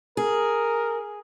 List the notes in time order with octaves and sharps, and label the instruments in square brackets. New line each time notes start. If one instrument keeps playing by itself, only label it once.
[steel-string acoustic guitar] G#4 [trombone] A#4